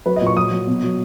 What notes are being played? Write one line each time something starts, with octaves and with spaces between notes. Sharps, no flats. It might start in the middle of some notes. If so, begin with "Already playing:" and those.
F#3 B4
D#5
A#2
C#6
F#3 D#6
F#3
B2
F#3